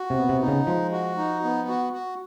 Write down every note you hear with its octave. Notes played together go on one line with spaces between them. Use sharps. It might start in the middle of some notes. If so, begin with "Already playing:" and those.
Already playing: F#4
C3
B3
C3
D#4
C#3
F3 G#3
F#4
D#4
B3
F#4
F#4